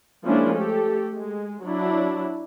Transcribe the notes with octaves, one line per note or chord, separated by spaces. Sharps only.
F3 G#3 A#3 C#4 D4 E4
A3 G4 A4
G#3
F#3 D4 E4